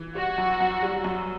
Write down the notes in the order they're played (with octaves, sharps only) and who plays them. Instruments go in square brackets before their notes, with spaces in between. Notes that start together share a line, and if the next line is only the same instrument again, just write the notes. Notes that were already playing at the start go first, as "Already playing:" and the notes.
Already playing: [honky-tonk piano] E3
[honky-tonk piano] G3 [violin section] F#4
[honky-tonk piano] F#2
F#2
G3
F#2